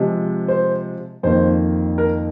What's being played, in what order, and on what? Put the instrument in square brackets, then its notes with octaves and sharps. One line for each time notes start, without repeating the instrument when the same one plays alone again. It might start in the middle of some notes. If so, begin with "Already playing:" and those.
Already playing: [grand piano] C3 F3 G#3
C5
F2 D#3 A#3 C5
A#4